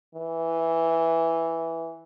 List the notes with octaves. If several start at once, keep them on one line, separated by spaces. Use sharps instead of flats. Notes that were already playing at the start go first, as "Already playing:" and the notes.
E3